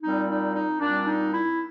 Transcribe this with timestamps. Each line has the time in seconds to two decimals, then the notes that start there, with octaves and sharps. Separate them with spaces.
0.02 A#2 G3 C4 D#4
0.29 D#4
0.55 D#4
0.81 A#2 G3 C4 D4
1.07 D#4
1.33 E4